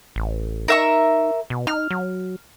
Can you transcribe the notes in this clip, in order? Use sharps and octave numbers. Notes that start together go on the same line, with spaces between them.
A1
D#4 A#4 E5 C#6
B2
D#4 F6
F#3